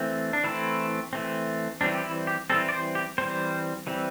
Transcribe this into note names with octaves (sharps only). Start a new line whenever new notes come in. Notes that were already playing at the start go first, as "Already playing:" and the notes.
Already playing: E3 A3 C4
D4
E3 A3 C4 E4
E3 A3 C4
E3 G3 C4 D4
G4
E4
G4
E3 G3 C4 A4
D5
C5
G4
E3 G3 C4 C5
E3 G3 C4